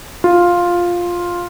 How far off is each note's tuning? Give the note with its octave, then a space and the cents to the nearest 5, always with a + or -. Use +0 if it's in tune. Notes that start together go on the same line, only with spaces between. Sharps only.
F4 +5